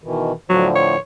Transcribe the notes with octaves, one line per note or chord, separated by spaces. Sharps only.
B2 D#3 E3
A2 D3 F3 F#3
C#5